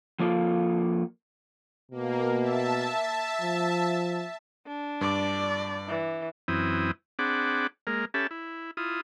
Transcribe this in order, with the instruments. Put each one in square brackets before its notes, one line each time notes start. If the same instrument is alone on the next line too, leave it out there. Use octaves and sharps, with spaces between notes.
[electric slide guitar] F3 A#3 F4 A4
[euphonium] B2 [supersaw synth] A#3
[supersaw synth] E5 A5
[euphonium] F3
[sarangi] D4
[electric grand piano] G2 D6 [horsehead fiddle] D5
[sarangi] E3
[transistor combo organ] F#2 E3 C4 E4 D#6
C4 D4 G#4 F#5 B5 D6
G#3 A#3 A#4
C#4 G4 A4 E5 A5 B5
E4
E4 F4 D#6